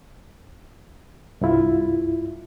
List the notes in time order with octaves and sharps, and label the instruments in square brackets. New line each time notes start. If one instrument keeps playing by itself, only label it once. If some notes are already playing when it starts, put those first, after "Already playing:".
[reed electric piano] C2 G2 E4 F4